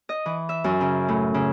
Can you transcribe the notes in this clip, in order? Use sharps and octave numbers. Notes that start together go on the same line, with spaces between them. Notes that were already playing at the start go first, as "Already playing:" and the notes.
D#5
E3
E5
F#2
C#3
A2
C#3